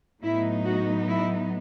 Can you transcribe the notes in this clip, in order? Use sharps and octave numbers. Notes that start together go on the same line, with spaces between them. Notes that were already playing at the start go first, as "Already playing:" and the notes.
A2 F#3 B3 D#4 E4
F#4
E4